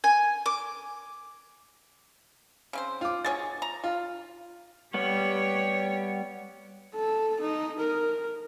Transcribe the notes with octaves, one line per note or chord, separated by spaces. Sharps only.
G#5
D6
C#3 C4 C5
F4 D6
B2 G#4 C#5 A6
A#5
F4
G3 B3 G4 C#5
A4
D#4
A#4